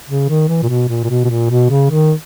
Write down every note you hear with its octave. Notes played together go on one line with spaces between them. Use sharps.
C#3
D#3
E3
A#2
B2
A#2
A#2
B2
B2
A#2
B2
C#3
D#3